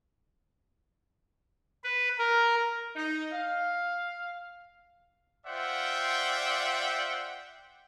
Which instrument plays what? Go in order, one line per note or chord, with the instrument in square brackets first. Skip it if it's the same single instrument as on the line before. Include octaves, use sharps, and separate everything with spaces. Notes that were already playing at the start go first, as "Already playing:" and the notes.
[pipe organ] B4
A#4
[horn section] D#4
F5
[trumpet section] F4 C5 D5 E5 F#5 G5